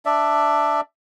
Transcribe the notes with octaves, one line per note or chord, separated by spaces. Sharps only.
D4 D5 E5